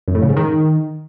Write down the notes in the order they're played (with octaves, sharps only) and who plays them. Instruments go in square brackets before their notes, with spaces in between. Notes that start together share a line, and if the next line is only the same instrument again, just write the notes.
[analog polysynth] F#2
A2
C#3
G#2
D#3